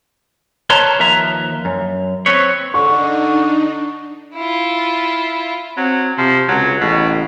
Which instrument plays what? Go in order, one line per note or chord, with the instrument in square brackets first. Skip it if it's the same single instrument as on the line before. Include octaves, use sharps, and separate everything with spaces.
[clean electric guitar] A#4 B4 C#5 A5 A#5 C6
D#2 F3 A#4 B4 E5 A#5
F#2
C4 B4 C#5
[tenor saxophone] D3 [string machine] D4 D#4 [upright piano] C#6
[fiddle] E4 F4
[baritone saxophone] F#3 [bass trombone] C4
[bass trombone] C3 [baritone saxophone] F3
[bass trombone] C#2 [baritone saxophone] F#3
[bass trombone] A1 [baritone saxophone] B2